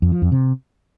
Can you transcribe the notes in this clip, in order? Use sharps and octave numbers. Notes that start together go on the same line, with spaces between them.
F2
F3
F2
C3